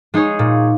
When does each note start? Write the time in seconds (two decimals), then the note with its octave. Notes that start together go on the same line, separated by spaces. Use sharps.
0.14 G#3 D#4 G#4 C#5
0.39 A#2